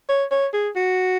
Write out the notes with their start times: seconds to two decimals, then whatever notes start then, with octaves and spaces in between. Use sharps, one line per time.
0.09 C#5
0.31 C#5
0.53 G#4
0.76 F#4